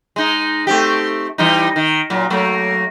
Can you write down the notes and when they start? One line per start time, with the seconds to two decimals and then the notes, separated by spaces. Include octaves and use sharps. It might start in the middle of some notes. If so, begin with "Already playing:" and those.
0.16 G#3 D#4
0.67 A3 C4 G4
1.38 E3 G3 D#4
1.76 D#3
2.10 A#2 F#3
2.30 F#3 A3 A#3